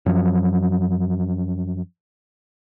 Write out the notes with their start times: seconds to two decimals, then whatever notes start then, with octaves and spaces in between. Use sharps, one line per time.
0.06 F#2 F3 F#3